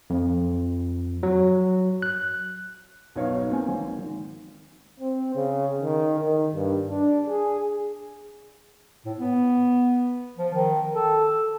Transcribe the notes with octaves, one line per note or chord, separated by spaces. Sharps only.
F2
F#3
F#6
B1 B3 D#4 C#5 F5
A#3 C4 G#5
G#1
G#1
C4
C#3
D#3
D#3
G2
D4
G#4
A2
B3
F3
D#3
A4